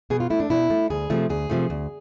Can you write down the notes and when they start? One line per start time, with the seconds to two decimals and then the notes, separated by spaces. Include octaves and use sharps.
0.10 B2 G#4
0.20 F4
0.30 A3 E4
0.40 D4
0.50 B2 E4
0.70 A3
0.90 D2 G#4
1.10 C3 F3 A3
1.30 D2 G#4
1.50 C3 F3 A3
1.70 D2